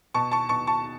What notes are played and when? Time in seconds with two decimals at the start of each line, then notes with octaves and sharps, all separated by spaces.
0.14 B2 A5 C#6
0.31 A5 C#6
0.49 B2 A5 C#6
0.67 A5 C#6